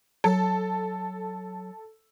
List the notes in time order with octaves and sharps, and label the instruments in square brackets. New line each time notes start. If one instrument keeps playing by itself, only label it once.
[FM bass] F#3 [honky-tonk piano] A4